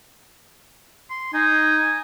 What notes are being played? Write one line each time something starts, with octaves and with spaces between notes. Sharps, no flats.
C6
D#4 G#5